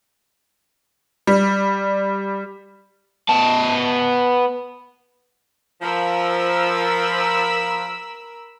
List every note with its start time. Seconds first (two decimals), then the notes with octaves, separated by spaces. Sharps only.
1.27 G3
3.29 B3 A5
5.82 F3 A#4 B5 E6